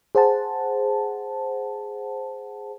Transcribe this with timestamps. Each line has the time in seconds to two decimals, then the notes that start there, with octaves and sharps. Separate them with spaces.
0.15 G#4 C5 F#5 A5